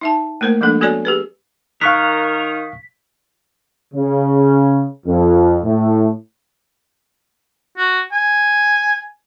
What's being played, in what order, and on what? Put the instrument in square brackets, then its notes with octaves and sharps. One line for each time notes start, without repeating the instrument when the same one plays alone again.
[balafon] D#4 E5 A5
A3 A#3 A#4 C5
F3 G#3 A#3 D4 A4
B3 F#4 A4 C#5 D5 G#5
G4 G#4 B4
[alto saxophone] D#3 [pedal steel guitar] A#4 [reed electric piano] F5 C#6 F#6 [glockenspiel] B6
[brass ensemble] C#3
F2
A2
[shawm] F#4
G#5